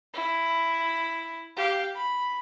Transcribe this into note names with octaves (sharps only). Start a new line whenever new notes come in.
E4
G4 F5
B5